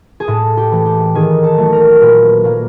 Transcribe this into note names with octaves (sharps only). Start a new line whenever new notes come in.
G#4
A2 A4
G4
E3 A3
G4
D#3 G#4
A4
F#3 A3
A#4
A#2 B4
F#3 A#3